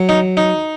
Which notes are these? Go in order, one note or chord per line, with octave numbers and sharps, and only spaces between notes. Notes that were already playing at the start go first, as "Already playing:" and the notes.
Already playing: F#3
D#4
D#4